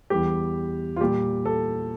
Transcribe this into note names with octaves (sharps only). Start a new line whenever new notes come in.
E2 E3 G3 G4
F4
A#2 G3 G4
A4